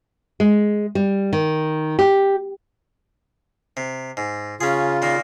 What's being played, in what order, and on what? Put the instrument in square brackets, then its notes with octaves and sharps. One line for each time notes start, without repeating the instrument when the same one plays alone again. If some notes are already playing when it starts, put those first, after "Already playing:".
[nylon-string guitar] G#3
G3
D#3
G4
[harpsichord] C3
G#2
[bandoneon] C#3 F4 [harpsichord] C#4 G#4
[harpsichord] A#2 D#3 A#3